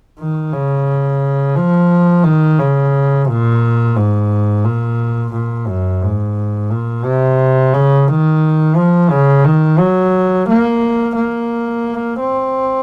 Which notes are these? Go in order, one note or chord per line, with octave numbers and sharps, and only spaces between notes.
D#3
C#3
F3
D#3
C#3
A#2
G#2
A#2
A#2
F#2
G#2
A#2
C3
C#3
D#3
F3
C#3
D#3
F#3
A#3
A#3
C4